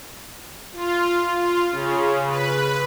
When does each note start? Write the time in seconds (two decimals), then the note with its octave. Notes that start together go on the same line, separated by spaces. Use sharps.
0.73 F4
1.35 F4
1.71 C#3
2.26 B4